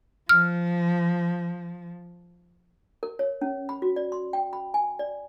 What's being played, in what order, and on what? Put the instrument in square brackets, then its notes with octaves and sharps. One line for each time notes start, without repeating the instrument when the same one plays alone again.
[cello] F3 [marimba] F6
[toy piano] A#4
C#5
C#4
B5
F#4
D5
C6
G5
B5
G#5
D5